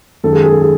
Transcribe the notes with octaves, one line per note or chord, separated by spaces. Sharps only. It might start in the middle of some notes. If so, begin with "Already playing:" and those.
F#2 D#3 G#3 A4
G#4
G#4
A4
G#4